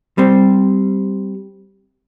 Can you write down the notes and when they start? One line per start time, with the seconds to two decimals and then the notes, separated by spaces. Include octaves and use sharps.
0.18 G3 C4